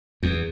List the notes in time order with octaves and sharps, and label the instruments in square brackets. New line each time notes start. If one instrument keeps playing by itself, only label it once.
[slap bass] E2